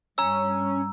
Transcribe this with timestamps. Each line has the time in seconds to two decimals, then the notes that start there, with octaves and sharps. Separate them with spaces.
0.18 G2 C#4 A#5 E6